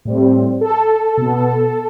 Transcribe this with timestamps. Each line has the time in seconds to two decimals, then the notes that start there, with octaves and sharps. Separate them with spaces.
0.05 A2 G3 C4
0.61 A4
1.17 B2 B3